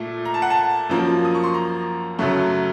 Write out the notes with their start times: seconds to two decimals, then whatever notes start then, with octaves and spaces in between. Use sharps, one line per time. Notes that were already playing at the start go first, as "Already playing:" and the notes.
Already playing: A#2 A3
0.25 A#5
0.34 A5
0.42 F#5
0.50 A5
0.89 F#2 F3 A#3
1.25 D#6
1.35 C#6
1.44 C6
1.54 A#5
2.19 F#2 C#3 F#3 A3